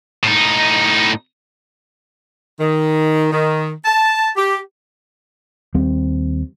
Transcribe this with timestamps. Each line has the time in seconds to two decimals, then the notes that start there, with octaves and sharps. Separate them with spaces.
0.24 A2 D#4
2.58 D#3
3.31 D#3
3.85 A5
4.36 G4
5.74 D#2 G3 C4